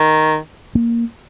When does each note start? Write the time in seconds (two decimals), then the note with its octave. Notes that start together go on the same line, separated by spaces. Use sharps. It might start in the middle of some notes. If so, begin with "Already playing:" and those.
Already playing: D#3
0.75 A#3